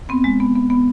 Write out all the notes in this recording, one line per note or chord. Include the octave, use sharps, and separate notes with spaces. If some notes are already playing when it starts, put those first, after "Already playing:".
B3 C4
G#3
B3
B3
B3